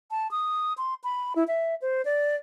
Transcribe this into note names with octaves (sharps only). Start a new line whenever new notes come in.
A5
D#6
C6
B5
E4
E5
C5
D5